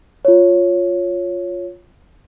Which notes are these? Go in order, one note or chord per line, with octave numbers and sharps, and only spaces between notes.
F4 C#5